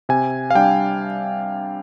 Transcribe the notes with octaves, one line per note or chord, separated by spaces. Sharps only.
C3 G#5
F5
G3 D4 G5